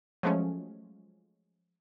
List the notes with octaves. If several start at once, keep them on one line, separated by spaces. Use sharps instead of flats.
F3 F#3 G#3 A3 C#4